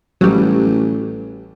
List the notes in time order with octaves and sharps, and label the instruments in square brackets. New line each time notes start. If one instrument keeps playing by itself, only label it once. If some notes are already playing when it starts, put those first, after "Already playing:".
[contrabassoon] A1 [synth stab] F#3 G3